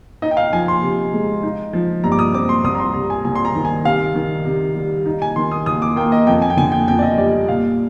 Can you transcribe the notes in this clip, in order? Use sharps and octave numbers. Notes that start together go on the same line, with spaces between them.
D#4 D#5
G5
F5
F3 G#5
C6
C3
G#3
D#4
F3
G2 A#5
D6
D#6
C4 D6
C6
C2 D#6
A#5
C6
C3 A#5
G#5
C2 G#5
C6
A#5
D#3
G#5
C3 F5
D#3
C3
G3
D#4
G#5
D#3 C6
D#6
D#2 D#6
D6
A#3 G5
D#5
F2 G5
G#5
G5
D3 G#5
G5
F2 G5
D5
D#5
G3 D5
A#2 F5